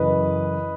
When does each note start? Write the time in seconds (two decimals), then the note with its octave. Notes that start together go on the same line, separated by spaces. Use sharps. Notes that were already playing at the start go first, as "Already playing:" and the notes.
Already playing: F#2 C#3 E3 B4 D#5